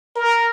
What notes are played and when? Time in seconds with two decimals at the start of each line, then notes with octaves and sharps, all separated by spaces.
0.16 A#4